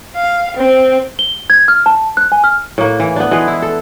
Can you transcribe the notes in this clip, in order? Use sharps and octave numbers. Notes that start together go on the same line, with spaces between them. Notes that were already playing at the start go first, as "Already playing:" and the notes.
F5
C4
G7
G#6
F6
A5
F#6
G#5
F6
A2 A#3
E3
B3 D4
E3 G#3 G#4 B4
E4
A4